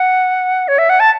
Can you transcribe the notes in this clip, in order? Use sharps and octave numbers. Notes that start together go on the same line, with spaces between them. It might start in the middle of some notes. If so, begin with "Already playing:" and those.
Already playing: F#5
C#5
E5
F#5
A5